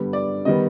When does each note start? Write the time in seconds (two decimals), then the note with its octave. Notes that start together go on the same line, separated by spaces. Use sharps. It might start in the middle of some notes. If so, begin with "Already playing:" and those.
Already playing: G2 D3 G3 B3
0.13 D5
0.45 D#3 G3 B3 D#5